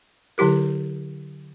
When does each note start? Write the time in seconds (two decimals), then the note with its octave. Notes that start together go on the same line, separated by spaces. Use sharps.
0.38 D3 F#3 E4 G4 A#4